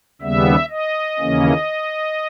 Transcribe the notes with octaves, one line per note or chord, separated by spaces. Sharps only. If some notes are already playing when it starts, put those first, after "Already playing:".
D#2 C#3 G3 B3 E5
D#5
D#2 C#3 E3 A#3 C#4